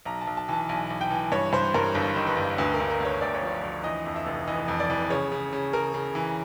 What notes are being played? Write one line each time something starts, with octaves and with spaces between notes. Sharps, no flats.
B1 A#5
A5
B1
A5
E3 A5
B1 G#5
B1
G5
E3
G2 C#5
G2 C5
G2 A#4
G1
D#3
B4
G1
D2 B4
A#4
D2
A#4
D2 C#5
D2 D5
C#5
F3 D5
D2
E3 D#5
F2
E5
F1
E3 D#5
F2
D5
E3
C#3 C#5
C#3
C#3
C#3 A#4
C#3
E3